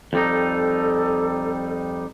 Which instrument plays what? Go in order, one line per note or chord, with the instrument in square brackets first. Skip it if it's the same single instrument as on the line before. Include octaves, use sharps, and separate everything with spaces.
[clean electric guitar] F2 G3 D#4 [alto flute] A4